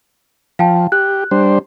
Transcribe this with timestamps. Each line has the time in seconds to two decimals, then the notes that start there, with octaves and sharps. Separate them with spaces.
0.59 F3 F5 G5 A5
0.92 G4 F#6
1.31 G3 D4 C5